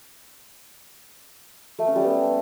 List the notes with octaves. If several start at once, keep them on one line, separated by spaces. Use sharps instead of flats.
A3
C#4
G3
B3